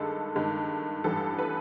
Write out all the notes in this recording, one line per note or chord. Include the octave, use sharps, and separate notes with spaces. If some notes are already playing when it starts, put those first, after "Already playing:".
Already playing: G2 D#3 G#3 A4
G2 D#3 G#3
A1 G2 E3 G3 A4
B4